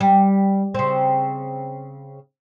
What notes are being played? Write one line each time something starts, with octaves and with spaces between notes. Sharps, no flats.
G3
C#3 C4